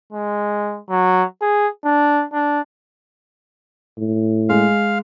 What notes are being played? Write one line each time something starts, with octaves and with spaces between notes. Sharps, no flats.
G#3
F#3
G#4
D4
D4
A2
G#3 F5